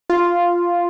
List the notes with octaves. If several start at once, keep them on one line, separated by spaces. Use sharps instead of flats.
F4